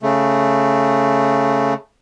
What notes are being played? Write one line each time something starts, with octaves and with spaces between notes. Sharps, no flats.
C#3 A3